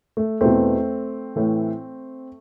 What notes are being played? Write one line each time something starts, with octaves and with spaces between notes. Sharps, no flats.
A3
E2 B2 A3 C4
A2 E3